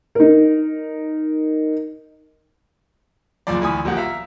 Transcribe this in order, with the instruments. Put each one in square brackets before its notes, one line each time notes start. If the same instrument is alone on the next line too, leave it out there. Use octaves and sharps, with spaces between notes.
[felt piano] D#4 A#4
[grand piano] C#2 F#2 A#2 F3 D5
D2 E3 G#5 B5 D#6
D#1 A#1 A#3 G4 F#5
E5 F5 A#5